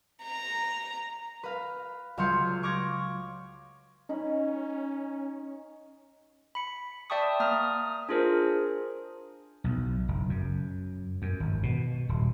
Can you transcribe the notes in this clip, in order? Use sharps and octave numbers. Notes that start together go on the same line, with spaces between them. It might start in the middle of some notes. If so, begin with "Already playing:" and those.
A#5
B4 F5
C#2 F#3 F5 C6 G6 C#7
C#6 D6 F6 G#6 A#6
C#4 D#4 B5
B5 C#7
D5 E5 G5 A5 C#6 D#6
A#3 A#5 D#6 F6
D4 F4 G#4 A#4 C5
B1
F#1
F#2
F#2
G#1
B2
D#1